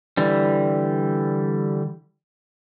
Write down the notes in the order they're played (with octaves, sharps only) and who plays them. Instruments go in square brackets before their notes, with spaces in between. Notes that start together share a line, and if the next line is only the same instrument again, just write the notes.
[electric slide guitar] D3 E3 G3